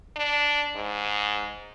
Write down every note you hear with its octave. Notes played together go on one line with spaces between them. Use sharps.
D4
G#2